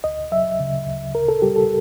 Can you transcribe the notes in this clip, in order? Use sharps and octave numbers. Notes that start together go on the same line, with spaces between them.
D2 D#5
F#3 E5
C#3
D2
D2 A#4
A4
G3 G4
A4